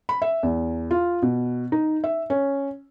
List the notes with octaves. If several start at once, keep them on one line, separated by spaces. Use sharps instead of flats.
B5
E5
E2
F4
B2
D#4
E5
C#4